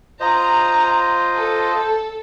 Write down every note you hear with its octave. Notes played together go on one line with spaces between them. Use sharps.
F4 C5 D#5 A#5
A4